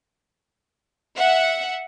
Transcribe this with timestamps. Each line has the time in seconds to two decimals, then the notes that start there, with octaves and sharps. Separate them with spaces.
1.16 E5 F#5